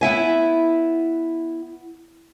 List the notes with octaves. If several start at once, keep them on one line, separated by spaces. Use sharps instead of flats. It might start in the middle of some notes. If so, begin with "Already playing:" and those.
B3 E4 E5 G#5